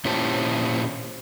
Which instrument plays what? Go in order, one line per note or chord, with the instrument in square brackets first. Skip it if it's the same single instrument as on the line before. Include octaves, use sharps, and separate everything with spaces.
[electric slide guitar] A#2 C#4 E4 G4 C5 A5